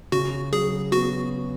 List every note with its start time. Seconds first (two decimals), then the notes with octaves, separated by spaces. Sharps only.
0.12 C#3 F#4
0.52 F#3 G#4
0.92 B3 F#4